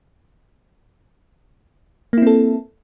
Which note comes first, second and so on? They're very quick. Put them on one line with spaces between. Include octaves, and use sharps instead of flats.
A#3 E4 C4 A4